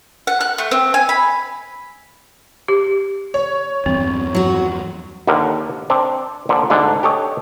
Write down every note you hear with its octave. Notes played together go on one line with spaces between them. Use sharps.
F#5
F#6
A3
C4
G#5
B5
G4
C#5
E2 G2 C4
F#3 F#4
D#2 D3 A#4
C4 D4
A#2 D3 F3
D2 G#2 D3 D4
G4 A4 C#5 D#5